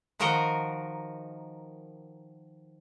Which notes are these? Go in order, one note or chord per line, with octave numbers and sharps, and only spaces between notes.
D#3 F3 F#4 A#4 D#5 A#5